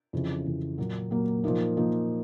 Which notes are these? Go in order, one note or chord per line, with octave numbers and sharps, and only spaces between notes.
F2 C#3 E3
F2 C#3 E3
A#2 F#3 A#3
A#2 F#3 A#3
A#2 F3 A#3 D#4
A#2 F3 A#3 D#4